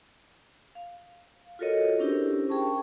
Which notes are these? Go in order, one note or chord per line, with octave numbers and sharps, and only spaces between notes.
F5
F4 F#4 A4 A#4 C#5 D#5
C#4 D4 E4 G4 A#4 C5
G#4 G5 A5 C#6